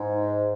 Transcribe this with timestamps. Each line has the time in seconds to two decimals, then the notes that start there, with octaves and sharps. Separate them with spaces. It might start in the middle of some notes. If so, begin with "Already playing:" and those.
Already playing: G#2